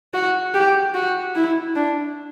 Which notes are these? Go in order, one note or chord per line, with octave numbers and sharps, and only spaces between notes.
F#4
G4
F#4
E4
D4